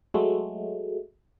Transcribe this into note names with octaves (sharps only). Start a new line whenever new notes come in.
F#3 G#3 A3